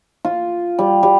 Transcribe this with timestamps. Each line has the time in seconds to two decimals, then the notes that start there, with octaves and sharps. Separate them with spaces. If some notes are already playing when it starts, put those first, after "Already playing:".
0.25 F4
0.79 G3
1.03 G3